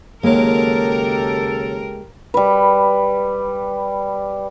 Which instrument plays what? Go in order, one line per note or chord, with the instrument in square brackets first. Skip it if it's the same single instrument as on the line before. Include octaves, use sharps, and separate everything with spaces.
[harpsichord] D#2 F#3 [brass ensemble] C#3 G4 A4 [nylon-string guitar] G#3 A#3 [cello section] A#4
[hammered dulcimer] G3 B4